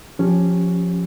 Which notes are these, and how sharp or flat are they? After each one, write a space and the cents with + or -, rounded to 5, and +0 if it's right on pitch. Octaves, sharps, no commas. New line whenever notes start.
F3 +15 C#4 +0 G4 +0